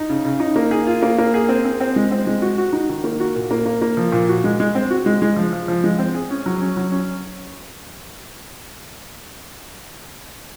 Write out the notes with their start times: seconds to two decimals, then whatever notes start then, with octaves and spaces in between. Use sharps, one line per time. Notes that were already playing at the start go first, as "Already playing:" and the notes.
Already playing: D#4
0.09 C#3
0.25 C#3
0.40 D#4
0.56 A#3
0.71 G#4
0.87 F4
1.02 A#3
1.18 A#3
1.34 G#4
1.49 C4
1.64 C4
1.81 C4
1.96 G#3
2.11 C4
2.27 G#3
2.42 F#4
2.58 F#4
2.73 D#4
2.89 D#3
3.04 A#3
3.20 F#4
3.36 A#2
3.51 A#3
3.66 A#3
3.82 A#3
3.97 F3
4.12 A#2
4.29 F#4
4.44 G#3
4.60 G#3
4.75 C4
4.90 F#4
5.06 G#3
5.22 G#3
5.36 F3
5.53 F3
5.68 F3
5.84 G#3
5.99 C4
6.14 G#4
6.30 C#4
6.46 F#3
6.61 C#4
6.77 F#3
6.92 C#4